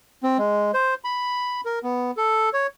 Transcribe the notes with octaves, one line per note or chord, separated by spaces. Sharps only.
C4
G#3
C5
B5
A#4
B3
A4
C#5